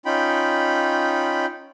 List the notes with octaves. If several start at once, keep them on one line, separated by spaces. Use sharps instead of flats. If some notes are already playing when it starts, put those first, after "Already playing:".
C#4 D#4 F4 G5 B5